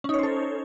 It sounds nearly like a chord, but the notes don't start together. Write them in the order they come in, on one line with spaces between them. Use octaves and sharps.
C#4 D#4 C#5 C5 A4